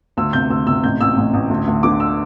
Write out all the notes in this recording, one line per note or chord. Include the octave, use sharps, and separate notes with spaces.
D2 E6
C3 G6
D2 E6
C3 E6
A1 G6
A1 E6
A1
A1
D2
D2
D3 D6
E6